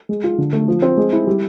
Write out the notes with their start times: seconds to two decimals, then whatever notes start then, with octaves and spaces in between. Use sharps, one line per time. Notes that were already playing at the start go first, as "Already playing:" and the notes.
0.09 G#3
0.24 F4
0.38 D3
0.53 A3
0.68 F3
0.82 C4
0.97 G#3
1.13 E4
1.27 G3